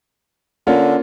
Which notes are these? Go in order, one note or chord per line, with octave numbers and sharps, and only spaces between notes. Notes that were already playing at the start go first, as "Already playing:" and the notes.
D3 A#3 C#4 F4